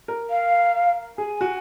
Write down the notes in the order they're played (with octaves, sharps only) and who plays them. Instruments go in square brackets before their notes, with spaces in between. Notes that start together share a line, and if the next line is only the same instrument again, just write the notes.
[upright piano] A#4
[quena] F5
[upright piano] G#4 [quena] G#5
[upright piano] F#4